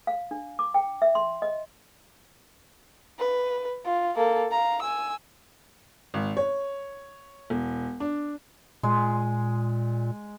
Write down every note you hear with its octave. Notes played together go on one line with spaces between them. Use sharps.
F5
D4
D6
G5
E5
C6
D#5
B4
F4
A#3 A4
F5 A#5
G#5 E6
G#1
C#5
E1
D4
A#2 G#3